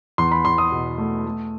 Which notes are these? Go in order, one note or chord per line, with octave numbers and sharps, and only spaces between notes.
E2 C6
B5
E2 C6
D#6
B2
A3
A3